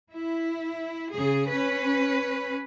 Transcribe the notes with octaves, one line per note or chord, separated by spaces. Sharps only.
E4
C#3 G#4
C#4 B4